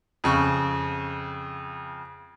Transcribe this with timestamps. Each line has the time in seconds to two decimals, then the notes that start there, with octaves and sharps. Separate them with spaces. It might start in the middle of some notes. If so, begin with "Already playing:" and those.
0.24 F2 C#3 C#6